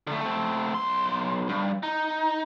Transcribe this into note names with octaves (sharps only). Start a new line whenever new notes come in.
D3 A3
A3 C4
B1 C6
G2
D#4